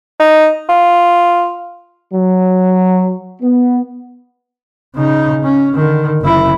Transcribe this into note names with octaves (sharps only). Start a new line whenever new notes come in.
D#4
F4
F#3
B3
C#3 D#4
C#4
D3 D#3
F#1 E4